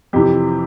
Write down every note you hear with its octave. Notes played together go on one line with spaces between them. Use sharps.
F2 C3 E3 G4